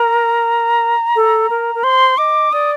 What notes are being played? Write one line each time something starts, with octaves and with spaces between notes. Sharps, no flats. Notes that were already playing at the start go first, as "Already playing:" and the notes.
Already playing: A#4 A#5
A4
A#4
A#4
C5 C6
D#5 D6
D5 D#6